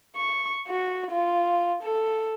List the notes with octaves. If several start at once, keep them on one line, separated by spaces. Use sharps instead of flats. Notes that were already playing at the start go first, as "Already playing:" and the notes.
C#6
F#4
F4
A4